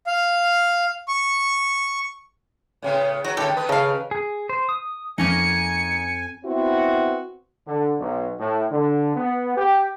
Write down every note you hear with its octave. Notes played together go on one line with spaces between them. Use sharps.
F5
C#6
A2 C#3 B3
F#3 F#4
A2 D3 D#3 G3 G4 A4
D#3 B4 D#5
C#3 A4 F5
G#4
C5
D#6
F2 A#3 C#4 D#4 G#5 C#7
B3 C4 E4 F#4
D3
B1
A2
D3
B3
G4